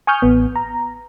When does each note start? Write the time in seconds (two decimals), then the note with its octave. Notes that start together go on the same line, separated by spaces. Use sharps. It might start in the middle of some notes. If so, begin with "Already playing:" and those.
0.07 G#5 C#6 D#6 F6 G6
0.22 A1 B3
0.56 A#5